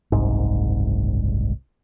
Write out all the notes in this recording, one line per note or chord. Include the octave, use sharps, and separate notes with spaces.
F#1 C2 G#2